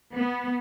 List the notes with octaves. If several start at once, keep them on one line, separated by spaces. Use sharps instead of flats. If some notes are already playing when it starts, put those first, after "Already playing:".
B3